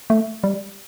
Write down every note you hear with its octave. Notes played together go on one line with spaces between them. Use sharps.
A3
G3